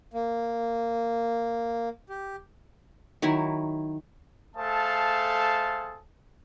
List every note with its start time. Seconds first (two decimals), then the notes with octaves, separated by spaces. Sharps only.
0.14 A#3
2.09 G4
3.22 D#3 F#3 E4
4.56 A3 G#4 A4 C5 F5 A5